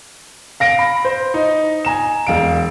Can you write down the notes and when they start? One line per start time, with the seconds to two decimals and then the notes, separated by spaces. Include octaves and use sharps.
0.60 F5 A#6 D7
0.79 B5
1.05 C5
1.34 D#4
1.85 G#5 A#5 E7
2.27 E1 F5 D7